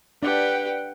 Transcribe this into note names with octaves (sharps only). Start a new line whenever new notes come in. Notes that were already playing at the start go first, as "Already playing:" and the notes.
D4 G4 B4 D5 F#5 G5